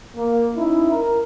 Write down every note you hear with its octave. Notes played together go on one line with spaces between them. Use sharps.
A#3
C#4 D#4 E4
A#4